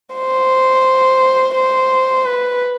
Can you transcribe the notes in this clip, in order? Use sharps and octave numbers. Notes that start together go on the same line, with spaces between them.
C5
C5
B4